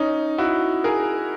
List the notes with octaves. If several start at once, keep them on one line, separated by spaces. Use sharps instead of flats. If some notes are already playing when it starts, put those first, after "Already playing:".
Already playing: C#4 D#4
E4 F#4
G#4 A#4